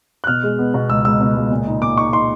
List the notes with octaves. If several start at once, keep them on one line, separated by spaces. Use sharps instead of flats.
F#6
B2 F6
G#3
B3
B2
C#2 E6
C#2 E6
B2
C#2
A#2
D#4
A#2 D6
D#4 C#6
D#4 C6